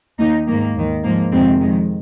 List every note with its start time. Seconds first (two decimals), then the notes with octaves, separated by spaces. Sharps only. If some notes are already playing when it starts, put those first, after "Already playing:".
0.19 D#2 D#3 A#3 D#4
0.47 G#2 D#3 A#3
0.76 D#2 D#3
1.04 G#2 F3 A#3
1.31 F2 C3 D#3 G#3 C4
1.60 F2 D#3 G#3